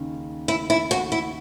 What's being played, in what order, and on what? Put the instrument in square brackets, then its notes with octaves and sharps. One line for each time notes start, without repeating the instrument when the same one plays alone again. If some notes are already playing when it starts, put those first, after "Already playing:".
Already playing: [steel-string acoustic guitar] D#2 C#3
E4
E4
F#4
E4